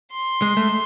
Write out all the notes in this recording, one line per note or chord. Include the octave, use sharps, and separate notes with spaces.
C6
G#3
A3